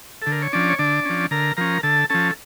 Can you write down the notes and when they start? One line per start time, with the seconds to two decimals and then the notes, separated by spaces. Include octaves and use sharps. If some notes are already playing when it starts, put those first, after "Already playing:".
0.22 D3 A4
0.32 A#4
0.42 C#5
0.53 F3 C#4 D4 D5
0.69 C#5
0.79 D3 D4 D5
1.05 F3 C#4
1.31 D3 A#4 A#5
1.57 F3 C#4 A#4 A#5
1.83 D3 A4 A5
2.10 F3 C#4 A4 A5